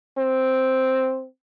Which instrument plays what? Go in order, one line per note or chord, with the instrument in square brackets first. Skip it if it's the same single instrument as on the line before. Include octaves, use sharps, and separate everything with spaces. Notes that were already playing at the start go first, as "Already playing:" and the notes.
[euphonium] C4